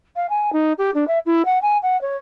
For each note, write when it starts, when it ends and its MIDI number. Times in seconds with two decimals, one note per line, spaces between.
0.16 0.27 77
0.30 0.50 80
0.53 0.73 63
0.78 0.91 67
0.94 1.07 62
1.08 1.19 76
1.26 1.45 64
1.45 1.59 78
1.62 1.78 80
1.83 1.99 78
2.01 2.17 73